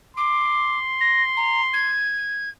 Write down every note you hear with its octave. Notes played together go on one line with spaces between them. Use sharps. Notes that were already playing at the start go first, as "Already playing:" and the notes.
C6 D6
A#6
A#5
G#6